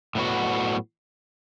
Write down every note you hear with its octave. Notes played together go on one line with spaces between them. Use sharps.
A2 F#3 B3 F#4